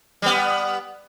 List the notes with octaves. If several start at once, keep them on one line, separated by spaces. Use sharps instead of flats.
G3 B3